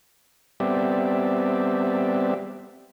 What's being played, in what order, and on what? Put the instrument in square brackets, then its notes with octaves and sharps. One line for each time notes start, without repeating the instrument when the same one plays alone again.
[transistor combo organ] G3 B3 C4 G4 D5 E5